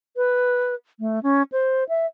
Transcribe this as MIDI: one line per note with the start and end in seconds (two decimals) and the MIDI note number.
0.17 0.75 71
1.00 1.19 57
1.23 1.42 61
1.52 1.84 72
1.89 2.06 76